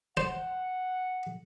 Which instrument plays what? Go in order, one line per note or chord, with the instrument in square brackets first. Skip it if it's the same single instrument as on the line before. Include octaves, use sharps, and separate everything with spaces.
[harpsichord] C5 [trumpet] F#5